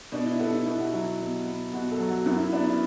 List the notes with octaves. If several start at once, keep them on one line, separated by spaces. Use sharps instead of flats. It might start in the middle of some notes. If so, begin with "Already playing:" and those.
B2 D4
E4
B3 A4
E4
B2 E4
F#4
F#3 E4
B2
B3
B2 F#4
A4
F#3
F#4
F#2 E4
E4
B3 D4
E4